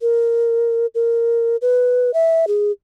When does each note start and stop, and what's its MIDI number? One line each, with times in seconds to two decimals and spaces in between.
0.01 0.86 70
0.95 1.56 70
1.62 2.11 71
2.14 2.45 76
2.47 2.71 68